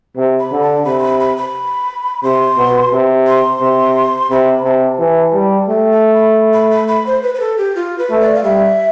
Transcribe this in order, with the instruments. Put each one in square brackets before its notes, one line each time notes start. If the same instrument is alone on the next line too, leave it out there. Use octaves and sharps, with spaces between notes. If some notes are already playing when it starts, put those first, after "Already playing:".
[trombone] C3
[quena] B5
[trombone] D3
[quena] A5
[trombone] C3 [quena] B5
[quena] C6
B5
B5
B5
[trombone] C3 [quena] C6
[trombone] B2
C3
[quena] C6
[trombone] C3
[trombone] C3 [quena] B5
[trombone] C3 [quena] A5
[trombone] E3
G3
[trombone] A3 [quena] G5
[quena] A5
B5
B5
B5
B5
C5
B4
B4
A4
G4
F4
B4
[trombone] A3
[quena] D5
F5
[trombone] G3 [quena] E5